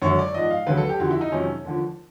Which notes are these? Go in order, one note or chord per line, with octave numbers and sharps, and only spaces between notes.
F#2 D3 F#3 C#5
D5
G#2 F3 D#5
F5
D2 C#3 F#3 B4
A4
G4
F2 D3 F3 F#4
E4
D#4
F2 C3 D#3 F#3 C#4
D#2 D3 F3